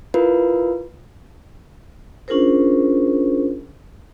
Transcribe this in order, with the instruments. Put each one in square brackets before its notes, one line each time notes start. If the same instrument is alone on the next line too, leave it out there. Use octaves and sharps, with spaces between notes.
[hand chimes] E4 F4 A#4 B4
[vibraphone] C#4 D4 F4 G#4 A#4 C5